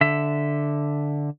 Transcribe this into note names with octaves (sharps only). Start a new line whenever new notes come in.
D3 E5